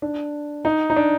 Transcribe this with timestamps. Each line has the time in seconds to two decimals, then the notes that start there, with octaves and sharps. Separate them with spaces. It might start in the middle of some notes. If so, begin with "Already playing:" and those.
0.02 D4
0.65 D#4
0.90 D#4
0.96 D4